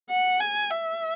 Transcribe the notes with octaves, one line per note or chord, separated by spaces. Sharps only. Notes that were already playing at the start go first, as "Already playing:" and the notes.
F#5
G#5
E5